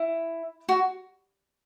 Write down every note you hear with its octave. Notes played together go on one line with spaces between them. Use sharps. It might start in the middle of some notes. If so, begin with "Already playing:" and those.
Already playing: E4
F#4